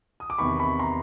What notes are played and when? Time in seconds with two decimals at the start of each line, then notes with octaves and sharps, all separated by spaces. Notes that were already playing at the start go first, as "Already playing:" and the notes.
0.20 D#6
0.30 D6
0.38 E2 C3 D#3 B5 C#6
0.59 B5 C#6
0.79 A#5 C6